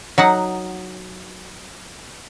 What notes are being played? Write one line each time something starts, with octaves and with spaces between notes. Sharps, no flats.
F#3 D#4 F#5